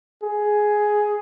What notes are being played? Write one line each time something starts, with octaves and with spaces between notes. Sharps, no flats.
G#4